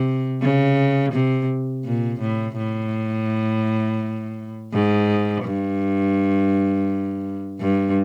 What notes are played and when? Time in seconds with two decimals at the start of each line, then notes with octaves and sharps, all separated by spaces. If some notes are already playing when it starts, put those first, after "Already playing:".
Already playing: C3
0.41 C#3
1.13 C3
1.85 A#2
2.21 A2
2.57 A2
4.73 G#2
5.45 G2
7.60 G2